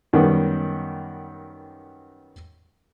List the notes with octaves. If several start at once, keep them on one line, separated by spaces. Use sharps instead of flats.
F#2 D#3 G3 B3